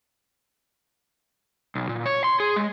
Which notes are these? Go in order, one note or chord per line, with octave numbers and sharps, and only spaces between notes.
B1
A#2
C#5
C6
G#4
G#3